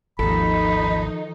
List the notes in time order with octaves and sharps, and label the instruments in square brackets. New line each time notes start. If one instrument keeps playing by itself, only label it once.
[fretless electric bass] G#1 D#2 [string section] D#3 F3 D#4 [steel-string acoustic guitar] A4 [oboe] B5